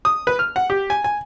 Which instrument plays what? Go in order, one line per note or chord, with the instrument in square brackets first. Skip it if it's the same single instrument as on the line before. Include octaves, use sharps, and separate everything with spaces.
[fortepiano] D#6
B4
F6
F#5
G4
G#5
G#5